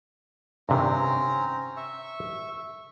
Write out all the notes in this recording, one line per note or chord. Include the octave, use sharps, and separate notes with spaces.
G2 C3 D#3 C4 C#4 A#5
E5 C#6